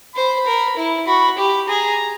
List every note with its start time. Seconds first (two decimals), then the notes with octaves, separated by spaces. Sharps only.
0.16 C5 B5
0.47 A#4
0.77 E4
1.07 F#4 B5
1.38 G4 B5
1.69 G#4 A#5